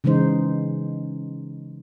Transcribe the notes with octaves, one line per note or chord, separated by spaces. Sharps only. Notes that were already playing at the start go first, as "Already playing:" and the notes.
C#3 E3 G#3 D#4 C5